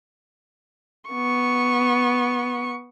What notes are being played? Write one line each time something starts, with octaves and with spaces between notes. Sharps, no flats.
B3 C#6